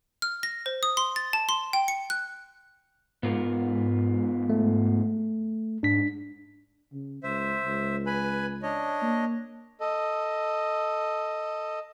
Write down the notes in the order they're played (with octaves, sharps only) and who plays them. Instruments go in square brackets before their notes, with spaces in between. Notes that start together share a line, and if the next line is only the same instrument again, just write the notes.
[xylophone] F6
A#6
C5
D#6
C6
A6
A5
C6
G5
C#7
F#6
[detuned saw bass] G#2 [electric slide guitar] B3 F4 A#4
[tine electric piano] A3
[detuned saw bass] G#2 [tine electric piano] D4 B6
[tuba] C#3
[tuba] C#2 [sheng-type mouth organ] C5 E5
[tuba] C#2
[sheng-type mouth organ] B4 G#5 B5
D4 C#5 D#5
[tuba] A#3
[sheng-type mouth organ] A4 D#5